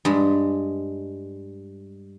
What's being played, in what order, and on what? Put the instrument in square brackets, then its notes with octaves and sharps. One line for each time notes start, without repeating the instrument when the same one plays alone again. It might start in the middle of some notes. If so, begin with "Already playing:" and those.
[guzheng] G2 G#3